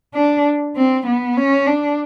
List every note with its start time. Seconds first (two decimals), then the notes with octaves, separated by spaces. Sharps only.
0.15 D4
0.76 C4
1.07 B3
1.37 C#4
1.67 D4